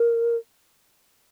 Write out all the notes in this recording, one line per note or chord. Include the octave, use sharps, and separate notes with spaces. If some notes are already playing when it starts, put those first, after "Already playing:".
Already playing: A#4